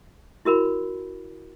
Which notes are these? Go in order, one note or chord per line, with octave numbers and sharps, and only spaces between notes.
E4 F#4 A#4 B5